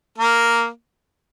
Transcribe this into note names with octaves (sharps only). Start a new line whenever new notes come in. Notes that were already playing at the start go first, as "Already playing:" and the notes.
A#3 A#4